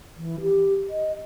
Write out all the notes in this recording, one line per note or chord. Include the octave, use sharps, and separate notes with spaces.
E3
G4
D#5